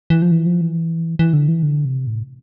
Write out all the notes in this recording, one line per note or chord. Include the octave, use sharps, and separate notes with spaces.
E3
F3
E3
F3
E3
E3
D3
E3
D3
C3
A2